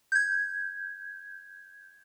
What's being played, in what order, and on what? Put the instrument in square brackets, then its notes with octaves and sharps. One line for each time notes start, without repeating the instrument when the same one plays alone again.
[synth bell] G6 G#6